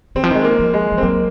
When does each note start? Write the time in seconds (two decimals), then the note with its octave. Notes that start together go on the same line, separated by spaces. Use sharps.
0.15 D#3 C4
0.24 F3
0.31 D#3 G#3
0.44 A#3
0.59 F3
0.74 G#3
0.92 F3
0.98 C4
1.03 F#3 A#3